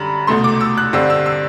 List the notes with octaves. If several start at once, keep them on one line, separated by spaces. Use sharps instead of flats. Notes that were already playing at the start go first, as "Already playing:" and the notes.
Already playing: F#2 D3 G3 B5
C2 B2 A3 C6
D6
E6
F#6
G2 D3 G3 C4 E6
E6
E6